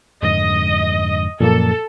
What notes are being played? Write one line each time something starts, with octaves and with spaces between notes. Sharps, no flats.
F2 G#2 D3 D#5
F#2 A#2 F3 A#3 A4